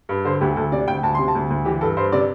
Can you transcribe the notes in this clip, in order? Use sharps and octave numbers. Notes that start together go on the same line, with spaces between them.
G2
D3 C5
D2 G4
D2 A4
C3 D5
D2 G5
D2 A5
C3 C6
A5
D2
D2
E3 G4
G2 A4
G2 C5
C3 D5